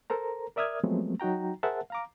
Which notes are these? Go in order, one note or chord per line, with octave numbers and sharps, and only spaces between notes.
A4 A#4 C5 A#5
A#4 D5 E5 D#6 F6 G#6
F3 F#3 G#3 A3 B3 C4
F#3 D#4 F#4 G5 A#5
G#4 A#4 C5 E5 F#5 A5
F5 A#5 D6